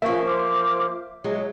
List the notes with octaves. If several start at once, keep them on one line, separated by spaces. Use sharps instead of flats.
F3 A#3 C#4 E5 F5 C#6
C5 D6 F6
F#3 G#3 C#5